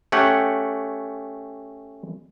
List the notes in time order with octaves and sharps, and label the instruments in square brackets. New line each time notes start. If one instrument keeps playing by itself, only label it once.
[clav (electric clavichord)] A3 C#4 G4 F#5